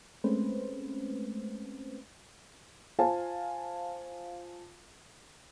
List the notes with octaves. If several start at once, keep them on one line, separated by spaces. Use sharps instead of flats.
G#3 A3 C4 C#4 B4 C5
F4 C5 F5 G#5 A5